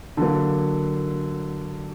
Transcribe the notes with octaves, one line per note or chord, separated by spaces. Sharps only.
D3 F#3 A#3